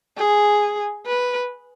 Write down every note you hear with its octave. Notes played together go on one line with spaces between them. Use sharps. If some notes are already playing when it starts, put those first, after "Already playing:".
G#4
B4